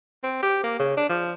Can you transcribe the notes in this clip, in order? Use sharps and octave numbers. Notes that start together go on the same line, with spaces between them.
C4
G4
A#3
C#3
D4
F3